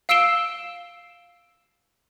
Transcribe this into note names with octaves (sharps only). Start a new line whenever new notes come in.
F5 E6 C7 D7 E7 G7